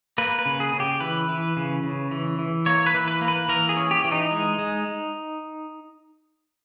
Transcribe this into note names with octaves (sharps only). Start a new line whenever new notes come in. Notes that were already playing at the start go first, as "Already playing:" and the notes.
A#3 B4
B4
C#3
G#4
C#3
G4
E3 B4
E3
C#3
C#3
E3
E3
A#3 C#5
B4
E3
B4
A#3
B4
E3 A#4
G#4
C#4
G4
E3
D#4
G#3
G#3